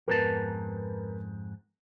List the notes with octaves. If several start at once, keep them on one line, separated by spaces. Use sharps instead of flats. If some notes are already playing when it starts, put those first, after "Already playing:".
F2 G#2 B3 A#4 B4 A5